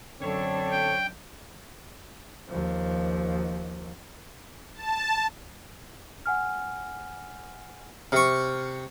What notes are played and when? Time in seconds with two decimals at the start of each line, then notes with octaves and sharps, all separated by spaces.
0.21 F#2 D3 C4 D4 A4 C#5
0.71 G5
2.48 D#2 F3
4.75 A5
6.26 F#5 G#5 F6
8.12 C3 C#6 F6